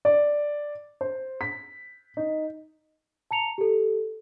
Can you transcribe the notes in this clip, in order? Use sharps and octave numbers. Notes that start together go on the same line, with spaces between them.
D5
C5
B6
D#4
A5 A#5 C#7 F7
G4 A4